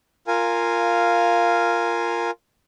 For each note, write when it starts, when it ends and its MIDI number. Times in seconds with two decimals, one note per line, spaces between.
0.27 2.31 65
0.27 2.31 70
0.27 2.31 77
0.27 2.31 80